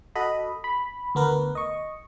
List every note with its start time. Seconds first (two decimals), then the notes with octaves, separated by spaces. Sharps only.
0.15 F#4 A4 D#5 B5
0.64 B5
1.15 D2 B3 A#4 B4
1.55 D#5 C#6